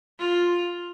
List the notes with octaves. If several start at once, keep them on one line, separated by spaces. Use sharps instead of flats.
F4